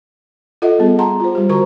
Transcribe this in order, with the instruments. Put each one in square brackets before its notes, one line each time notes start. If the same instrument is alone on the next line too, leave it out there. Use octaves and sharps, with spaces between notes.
[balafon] F4 A4 D#5 E5 F#5
G3 B3 G#4
F#5 A5 A#5 C6
F4 C5
G3 G4
D3 F#4 A#4 C5 A#5 C#6